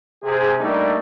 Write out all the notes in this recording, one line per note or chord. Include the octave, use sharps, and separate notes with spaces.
C3 G#4
G3 A3 A#3 D4 D#4